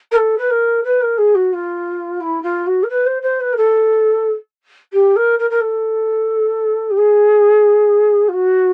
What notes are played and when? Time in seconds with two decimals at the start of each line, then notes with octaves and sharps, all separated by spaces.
0.11 A#4
0.16 A4
0.37 B4
0.50 A#4
0.83 B4
1.01 A#4
1.17 G#4
1.34 F#4
1.53 F4
2.20 E4
2.42 F4
2.66 F#4
2.83 A#4
2.89 B4
3.05 C5
3.22 C5
3.40 B4
3.52 A#4
3.56 A4
4.93 G4
5.16 A#4
5.39 A#4
5.50 A#4
5.60 A4
6.90 G4
6.97 G#4
8.28 F4
8.33 F#4